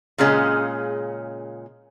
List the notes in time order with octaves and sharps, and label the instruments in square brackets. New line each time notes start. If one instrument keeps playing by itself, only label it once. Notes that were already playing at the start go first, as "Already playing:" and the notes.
[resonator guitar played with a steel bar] A#2 C#3 G#3 C#4 G#4